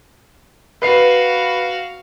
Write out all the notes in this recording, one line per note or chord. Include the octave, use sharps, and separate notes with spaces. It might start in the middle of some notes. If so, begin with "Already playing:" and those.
F#4 B4 F5 C7